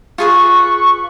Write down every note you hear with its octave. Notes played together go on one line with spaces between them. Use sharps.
F4 G#4 B4 C#6